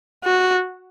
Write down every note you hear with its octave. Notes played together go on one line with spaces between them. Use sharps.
F#4